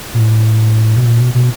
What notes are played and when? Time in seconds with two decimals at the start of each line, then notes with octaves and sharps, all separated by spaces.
0.14 A#2
0.19 A2
0.96 B2
1.06 A#2
1.20 B2
1.34 B2